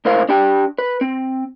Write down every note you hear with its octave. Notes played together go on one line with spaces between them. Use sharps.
C#2 A2 A#4 C5 F5
D4 G4 G5
B4
C4